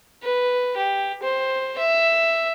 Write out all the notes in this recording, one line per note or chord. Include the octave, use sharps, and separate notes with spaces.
B4
G4
C5
E5